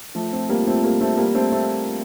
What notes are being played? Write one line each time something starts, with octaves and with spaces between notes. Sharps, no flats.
F3 A3
A3 C4
G3 A#3
A3 C4
G3 A#3
A3 C4
G3 A#3
A3 C4
A3 C4